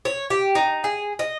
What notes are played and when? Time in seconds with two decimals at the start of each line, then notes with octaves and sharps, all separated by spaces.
0.05 C#5
0.30 G4
0.55 D#4
0.84 G#4
1.19 D#5